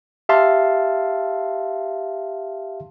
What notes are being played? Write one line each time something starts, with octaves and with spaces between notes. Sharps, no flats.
G4 E5 F5 A5 C6